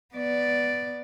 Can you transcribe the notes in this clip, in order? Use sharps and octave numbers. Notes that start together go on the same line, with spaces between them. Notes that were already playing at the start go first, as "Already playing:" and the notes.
B3 D5